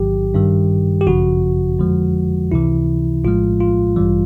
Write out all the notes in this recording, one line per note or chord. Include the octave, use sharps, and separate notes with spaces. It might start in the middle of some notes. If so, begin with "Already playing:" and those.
Already playing: A1 G#2 D#3 F#3 G4
G2 D#3 G3
G4
G#1 F#2 C#3 F3 F#4
F2 D3 F3 G#3
C#2 C3 E3 E4
A#1 A2 F3 G#3 F4
F4
A1 G2 E3 G3